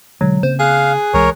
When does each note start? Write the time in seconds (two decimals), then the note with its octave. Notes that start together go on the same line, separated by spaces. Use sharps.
0.21 B2 D3 F#3 G#3
0.43 C#3 A#3 C4 C5
0.60 G#4 F5 F#6
1.14 C2 E3 G#3 A#4 C#5